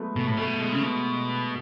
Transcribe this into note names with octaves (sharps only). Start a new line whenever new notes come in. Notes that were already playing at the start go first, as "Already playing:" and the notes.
Already playing: F#3 G#3 A3 B3
B2 A3
A2
B2 A3
G#3
C#3
B2